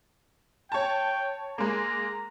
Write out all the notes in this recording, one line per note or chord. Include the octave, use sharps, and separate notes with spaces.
C#5 G5 A5
G#3 A#3 A#5